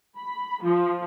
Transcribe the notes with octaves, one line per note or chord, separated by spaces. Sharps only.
B5
F3